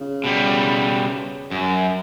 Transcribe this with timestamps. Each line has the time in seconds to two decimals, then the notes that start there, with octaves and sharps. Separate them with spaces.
0.01 C#3
0.24 B2 G3
1.51 F#2